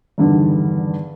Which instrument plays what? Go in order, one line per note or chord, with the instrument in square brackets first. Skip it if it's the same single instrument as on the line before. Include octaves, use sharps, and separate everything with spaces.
[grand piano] E2 G2 D3 D#3